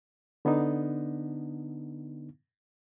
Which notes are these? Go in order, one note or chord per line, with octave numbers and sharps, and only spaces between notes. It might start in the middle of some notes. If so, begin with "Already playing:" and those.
D3 B3 D4 D#4